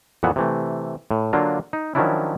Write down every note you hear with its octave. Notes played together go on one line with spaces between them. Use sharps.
F2 A#2 E3 B3 E5 F#5
C3 E3 A3
A2
D3 F#3 A#3 D4 F4
D#4
D#3 F3 F#3 C#4 D4 E4